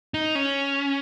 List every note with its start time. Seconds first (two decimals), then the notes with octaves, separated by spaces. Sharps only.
0.14 D#4
0.35 C#4